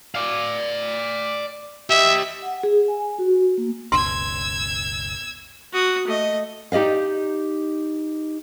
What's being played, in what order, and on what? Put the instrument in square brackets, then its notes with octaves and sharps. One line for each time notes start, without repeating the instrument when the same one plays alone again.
[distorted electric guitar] D5 F5
[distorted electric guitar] G4 D#5 [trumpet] E5
[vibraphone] F#5
G#4
G#5
F#4
A#3
[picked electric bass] F#1 C#2 B2 [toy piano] C6 [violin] E6 G#6
[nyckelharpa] F#4 D#6
A3 D#5
[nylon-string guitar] D#4 G4 D5 D#5 F5